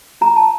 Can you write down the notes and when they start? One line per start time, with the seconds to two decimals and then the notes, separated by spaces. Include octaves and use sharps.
0.21 F4 A#5
0.36 A5